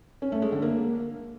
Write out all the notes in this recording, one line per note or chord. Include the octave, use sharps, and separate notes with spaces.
C#4
A3
G#3
D3
A#3